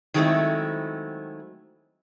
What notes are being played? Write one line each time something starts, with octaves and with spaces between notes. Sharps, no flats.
D#3 F#3 G#3 A3 C4 E4